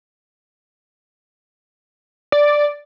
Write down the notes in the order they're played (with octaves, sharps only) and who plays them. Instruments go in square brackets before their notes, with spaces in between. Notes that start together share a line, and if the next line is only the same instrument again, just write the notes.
[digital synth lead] D5